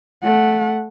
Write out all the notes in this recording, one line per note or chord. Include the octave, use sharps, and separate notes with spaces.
A3 F#5